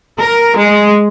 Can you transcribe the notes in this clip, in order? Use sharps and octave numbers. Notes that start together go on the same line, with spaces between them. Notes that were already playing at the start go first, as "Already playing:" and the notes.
A#4
G#3